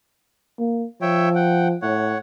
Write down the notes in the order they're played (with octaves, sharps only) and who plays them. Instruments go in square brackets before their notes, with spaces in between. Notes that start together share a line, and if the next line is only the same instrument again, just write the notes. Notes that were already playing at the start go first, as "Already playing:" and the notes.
[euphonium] A#3
[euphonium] F3 [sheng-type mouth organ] C#5 E5 G5
[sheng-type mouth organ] F#5 G5
[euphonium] A2 [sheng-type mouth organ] C#5 F#5